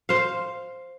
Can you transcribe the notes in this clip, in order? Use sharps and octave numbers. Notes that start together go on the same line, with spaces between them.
C5 F5